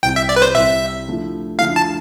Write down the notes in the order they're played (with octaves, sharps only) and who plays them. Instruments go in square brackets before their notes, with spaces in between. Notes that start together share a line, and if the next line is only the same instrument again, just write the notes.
[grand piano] C2 C3 G3 C4 E4 [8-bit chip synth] G5
[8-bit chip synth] E5
D5
B4
C5
[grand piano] C2 C3 G3 C4 E4 [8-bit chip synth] E5
[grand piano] D3 F3 A3 E4
[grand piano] D3 F3 A3 E4 [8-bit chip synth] F5
[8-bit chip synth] A5